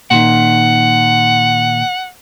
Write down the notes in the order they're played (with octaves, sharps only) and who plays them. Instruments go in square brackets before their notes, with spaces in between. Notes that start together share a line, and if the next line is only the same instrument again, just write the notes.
[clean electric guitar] A#2 D#3 [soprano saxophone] F#5